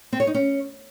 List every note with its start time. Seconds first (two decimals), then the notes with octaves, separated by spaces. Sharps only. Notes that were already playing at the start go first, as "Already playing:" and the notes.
0.13 C4
0.20 C#5
0.27 D#4
0.34 C#4